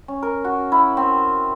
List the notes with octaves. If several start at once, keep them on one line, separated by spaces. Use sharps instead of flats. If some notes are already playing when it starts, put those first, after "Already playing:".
C#4
A#4
F#4
E4
C4